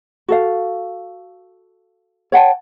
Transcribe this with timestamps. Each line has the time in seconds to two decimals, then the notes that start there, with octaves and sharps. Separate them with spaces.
0.28 F#4 A4 F5
2.32 C#5 F#5 G5 A5